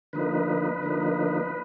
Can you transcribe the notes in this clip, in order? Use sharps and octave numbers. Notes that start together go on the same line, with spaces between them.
D3 F3 A#3 D#4 B4
D3 F3 A#3 D#4